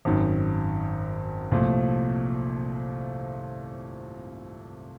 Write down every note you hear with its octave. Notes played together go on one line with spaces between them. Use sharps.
G#1 F#2 D#3
C2 A#2 F3 A3